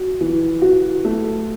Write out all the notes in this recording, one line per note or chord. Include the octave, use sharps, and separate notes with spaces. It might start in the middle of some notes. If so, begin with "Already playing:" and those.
Already playing: F#4
E3
F#4
A3